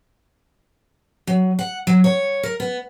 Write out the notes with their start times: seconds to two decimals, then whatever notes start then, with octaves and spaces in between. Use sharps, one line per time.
1.27 F#3
1.59 F#5
1.87 F#3
2.04 C#5
2.43 A#4
2.60 B3